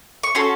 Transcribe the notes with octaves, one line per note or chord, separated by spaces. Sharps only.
C#6
C#4 F#4 A4 C6